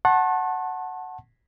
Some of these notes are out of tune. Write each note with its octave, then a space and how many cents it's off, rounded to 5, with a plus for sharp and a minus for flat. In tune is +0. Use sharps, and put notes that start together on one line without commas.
F#5 +0 A5 +0 C#6 -45